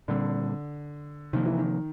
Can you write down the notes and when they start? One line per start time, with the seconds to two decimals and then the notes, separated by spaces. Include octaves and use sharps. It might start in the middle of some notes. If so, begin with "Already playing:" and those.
0.08 A#2 D3 G3 C4
1.33 C3 D#3 F3 A#3
1.46 E3
1.58 D#3